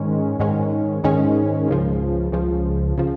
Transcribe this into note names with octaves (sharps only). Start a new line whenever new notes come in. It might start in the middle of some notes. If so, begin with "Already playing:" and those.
Already playing: G#2 D#3 G#3 C#4
G#2 D#3 G#3 C#4
G#2 D#3 G#3 C#4
C#2 C#3 F3
C#2 C#3 F3
C#3 F3